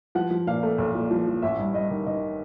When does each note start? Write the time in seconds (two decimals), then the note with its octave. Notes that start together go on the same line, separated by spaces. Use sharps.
0.15 F3 F#5
0.31 F3
0.47 A#2 F5
0.63 A3
0.78 B1
0.95 A#2
1.11 F3
1.27 F3
1.42 A1 E5
1.58 G2
1.74 G2 D#5
1.90 D#3
2.06 D#3 D#5